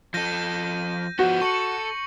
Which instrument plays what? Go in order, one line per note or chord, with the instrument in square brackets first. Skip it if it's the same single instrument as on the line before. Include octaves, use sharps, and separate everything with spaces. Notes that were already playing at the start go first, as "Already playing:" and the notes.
[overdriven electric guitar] F3 A4 [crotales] G6 A#6 D#7
[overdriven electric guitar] F3 B3 [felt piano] F#4 [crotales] G7
[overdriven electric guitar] A4 [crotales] C#6 C#7 F#7